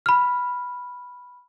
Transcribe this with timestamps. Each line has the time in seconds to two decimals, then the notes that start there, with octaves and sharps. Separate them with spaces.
0.06 B5 F6